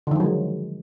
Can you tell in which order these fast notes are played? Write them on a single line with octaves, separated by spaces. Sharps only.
D3 D#3 F3 F#3 G#3